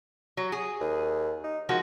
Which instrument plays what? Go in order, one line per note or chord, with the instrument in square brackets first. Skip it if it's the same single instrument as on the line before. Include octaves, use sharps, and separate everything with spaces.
[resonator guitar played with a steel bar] F#3
G#4
[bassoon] D#2
D#4
[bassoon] D#3 [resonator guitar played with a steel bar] F3 G#3 F#4